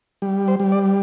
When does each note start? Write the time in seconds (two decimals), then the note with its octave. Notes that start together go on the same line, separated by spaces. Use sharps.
0.22 G3
0.48 C5
0.60 G3
0.72 D5